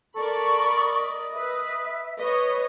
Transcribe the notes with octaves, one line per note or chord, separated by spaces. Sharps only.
A4 A#4 D5 B5 C#6
D#5
B4 E5
B4 C#5 D#5